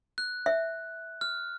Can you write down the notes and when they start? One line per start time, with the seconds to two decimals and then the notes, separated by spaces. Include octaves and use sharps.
0.18 F#6
0.46 E5
1.21 F6